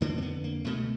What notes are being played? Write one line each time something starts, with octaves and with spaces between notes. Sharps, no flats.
F2 D3 A#3
C4
B3
A#3
C#2 B2 A3